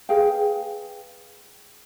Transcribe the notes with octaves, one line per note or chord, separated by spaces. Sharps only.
G#4 B4 F5 G5